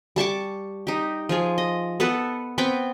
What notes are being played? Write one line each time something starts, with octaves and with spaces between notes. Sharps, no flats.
G3 A5 C#6 D6
D#4 G4
F3 F4 G#4
D#5
B3 A4 B4 F#5
B3 C4 B4 G5